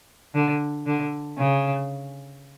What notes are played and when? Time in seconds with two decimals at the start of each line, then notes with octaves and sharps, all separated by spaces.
0.35 D3
0.86 D3
1.38 C#3